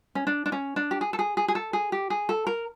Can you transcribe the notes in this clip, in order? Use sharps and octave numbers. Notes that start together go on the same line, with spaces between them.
C#4
D4
D4
C#4
D4
G4
G#4
A4
G#4
G#4
G#4
A4
G#4
G4
G#4
A4
A#4